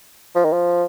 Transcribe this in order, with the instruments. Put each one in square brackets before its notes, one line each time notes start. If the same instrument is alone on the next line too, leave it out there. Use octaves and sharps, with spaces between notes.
[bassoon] F3
D#3
F3